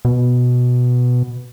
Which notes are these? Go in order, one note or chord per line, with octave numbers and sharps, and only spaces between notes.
B2